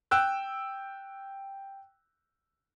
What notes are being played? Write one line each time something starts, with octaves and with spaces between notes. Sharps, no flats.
G5 E6 F#6